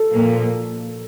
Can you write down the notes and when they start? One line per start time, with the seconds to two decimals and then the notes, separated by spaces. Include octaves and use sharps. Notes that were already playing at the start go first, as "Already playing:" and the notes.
Already playing: A4
0.11 A#2 F3 A#3